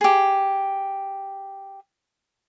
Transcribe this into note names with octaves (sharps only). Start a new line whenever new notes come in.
G4 G#4